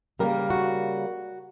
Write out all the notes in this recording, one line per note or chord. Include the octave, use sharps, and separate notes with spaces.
C#3 G3 A#3 A#4
F#4